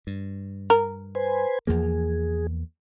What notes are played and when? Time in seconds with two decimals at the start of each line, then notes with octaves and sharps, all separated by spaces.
0.07 G2
0.70 A#4
1.15 B4 C5 G#5
1.67 E2 F3 A#3 G#4